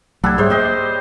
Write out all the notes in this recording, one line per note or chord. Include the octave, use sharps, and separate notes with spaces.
C2 F#3 G3 A3 D4 F#5 E6 G#6
G#2 G3 A3 G#4 C5 C#5 E5
A#3 G4 C5 D#5